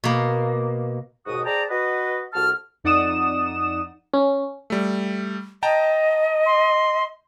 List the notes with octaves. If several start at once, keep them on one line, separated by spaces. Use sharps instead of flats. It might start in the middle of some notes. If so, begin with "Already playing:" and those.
B2 A#3
D#2 G#2 B2 F#4 D#6
G#4 C5 D5 G5 A5 A#5
F#4 B4 D#5
C2 F#4 A4 A5 F6
F2 D#4 D5 F#5 D#6 E7
C#4
G3 A3
D#5 G5 A5 A#5
C6